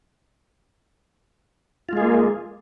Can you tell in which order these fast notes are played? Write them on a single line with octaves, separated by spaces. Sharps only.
F4 G#3 G#4 A#3